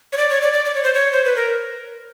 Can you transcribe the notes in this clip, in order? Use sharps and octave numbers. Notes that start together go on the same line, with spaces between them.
C#5
D5
C#5
D5
D5
D5
C#5
C5
C#5
C5
B4
A#4